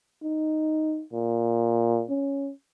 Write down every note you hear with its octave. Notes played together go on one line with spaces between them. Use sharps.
D#4
A#2
C#4